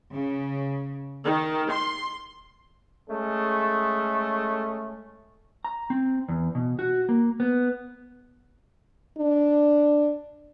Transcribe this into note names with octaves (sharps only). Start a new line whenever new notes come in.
C#3
D#3
C6
G#3 A3 C#4 G#4 A4
A#5
C4
E2
B2
F#4
A#3
B3
D4